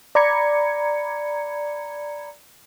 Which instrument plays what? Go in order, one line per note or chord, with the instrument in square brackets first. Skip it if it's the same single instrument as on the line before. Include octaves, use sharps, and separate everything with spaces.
[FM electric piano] D5 A#5 B5 G#6 C#7